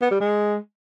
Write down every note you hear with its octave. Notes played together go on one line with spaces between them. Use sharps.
B3
G3
G#3